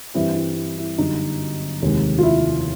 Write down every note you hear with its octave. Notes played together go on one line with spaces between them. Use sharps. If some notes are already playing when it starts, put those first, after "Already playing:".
G2 E3 G3 C4 E4
E4
E4
E4
G1 F#2 D3 G3 D#4
F1 D#2 D#3 G#3
F4
E4